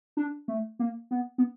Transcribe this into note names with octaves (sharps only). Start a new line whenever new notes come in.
D4
A3
A#3
B3
B3